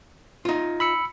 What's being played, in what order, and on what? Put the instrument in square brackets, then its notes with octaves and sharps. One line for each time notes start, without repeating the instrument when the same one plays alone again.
[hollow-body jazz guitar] D#4 F4
[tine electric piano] B5 E6 C#7